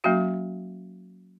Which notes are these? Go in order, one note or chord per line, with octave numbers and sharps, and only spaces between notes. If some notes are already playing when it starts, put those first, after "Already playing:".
F#3 A#3 C#4 F#4 F5